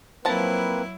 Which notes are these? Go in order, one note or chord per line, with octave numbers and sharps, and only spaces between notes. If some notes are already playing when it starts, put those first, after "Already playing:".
F3 F#3 A#3 C4 E4 B4 A5 A#5